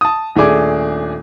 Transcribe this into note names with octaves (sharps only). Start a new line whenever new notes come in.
A5 D#6
D#1 A3 D4 G#4 D6